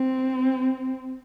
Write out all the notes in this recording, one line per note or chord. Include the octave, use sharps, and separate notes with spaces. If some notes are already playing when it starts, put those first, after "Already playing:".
Already playing: C4